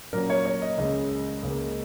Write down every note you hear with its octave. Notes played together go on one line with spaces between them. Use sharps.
A#2 F#3 A#3 C#4 A#4
C#5
C#5
D#5
C#2 C#3 G#3 C#4 D#5
C#2 C#3 A#3